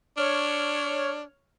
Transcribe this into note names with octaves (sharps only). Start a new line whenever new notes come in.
D4 C#5 F6